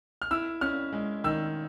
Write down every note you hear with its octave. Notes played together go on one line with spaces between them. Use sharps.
F6
E4 E6
C#4 F6
G#3
D#3 E6